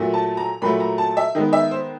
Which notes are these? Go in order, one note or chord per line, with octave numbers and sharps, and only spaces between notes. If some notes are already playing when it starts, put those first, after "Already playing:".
Already playing: A#2 F#3 A3
A5
A#5
A#2 F#3 A3 B5
A#5
A5
E5
D#3 G#3 B3 D#5
E5
C5